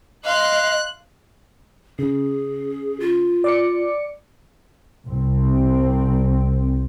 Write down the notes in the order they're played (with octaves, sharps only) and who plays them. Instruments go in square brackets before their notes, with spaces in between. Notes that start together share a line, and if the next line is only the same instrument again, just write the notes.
[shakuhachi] D#5 [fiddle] F5 C6 [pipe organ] F#6
[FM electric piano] C#3 [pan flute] G#4
[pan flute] F4
[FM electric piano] D5 D6 C#7
[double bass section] C2 C4